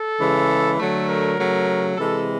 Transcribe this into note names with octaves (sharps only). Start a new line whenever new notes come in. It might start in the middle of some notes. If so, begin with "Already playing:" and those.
Already playing: A4
C#3 E3 G#3
D3 F#3 A3 A4
A#4
C#3 F#3 A3
C3 E3 G#3 A4